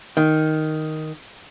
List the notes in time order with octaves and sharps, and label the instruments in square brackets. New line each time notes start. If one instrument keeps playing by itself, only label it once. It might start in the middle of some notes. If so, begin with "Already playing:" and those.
[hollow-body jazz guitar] D#3